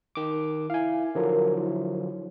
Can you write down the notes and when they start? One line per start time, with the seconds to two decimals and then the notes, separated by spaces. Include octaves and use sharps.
0.15 D#3 D6
0.70 E4 F5 G#5
1.15 D3 F3 F#3 A#4
1.56 E4